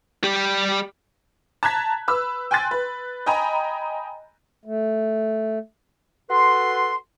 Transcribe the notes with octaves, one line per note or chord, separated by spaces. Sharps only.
G3 G4
A5 A#5 F#6 G#6 B6
B4 E6
G5 G#5 C6 F#6 A6
B4
D#5 G5 G#5 A#5 B5
A3
F#4 A4 B4 C6